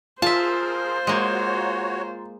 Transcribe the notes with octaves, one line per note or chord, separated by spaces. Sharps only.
F4 G#4 A#4 C5 E5 A5
G#3 A#3 F#4 C#5